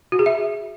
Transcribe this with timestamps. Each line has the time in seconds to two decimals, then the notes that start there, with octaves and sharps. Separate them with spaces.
0.12 F#4
0.19 G#4
0.26 E5